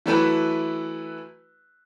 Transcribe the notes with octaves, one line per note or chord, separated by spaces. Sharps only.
E3 F#3 A3 E4 B4